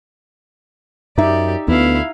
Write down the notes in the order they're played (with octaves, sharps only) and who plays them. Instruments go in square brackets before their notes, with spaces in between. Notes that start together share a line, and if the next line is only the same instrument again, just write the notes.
[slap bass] F#2 [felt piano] D#4 E5 [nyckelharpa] G4 D5
[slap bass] D2 [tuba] B3 [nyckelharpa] E4 F5